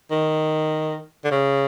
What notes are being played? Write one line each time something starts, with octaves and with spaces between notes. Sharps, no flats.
D#3
D3
C#3